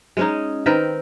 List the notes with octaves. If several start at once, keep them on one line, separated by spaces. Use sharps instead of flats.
G#3 C#4 D#4
D#3 C4 A#4 B4